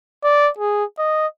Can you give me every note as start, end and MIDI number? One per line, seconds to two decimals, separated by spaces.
0.24 0.50 74
0.58 0.84 68
0.99 1.27 75